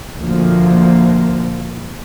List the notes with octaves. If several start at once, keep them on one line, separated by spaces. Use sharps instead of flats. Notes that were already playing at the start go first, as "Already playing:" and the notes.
D2 A#2 F3 A#3